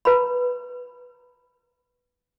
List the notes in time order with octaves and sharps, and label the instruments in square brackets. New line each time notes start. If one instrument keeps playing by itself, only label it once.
[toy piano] B4 A#5 B5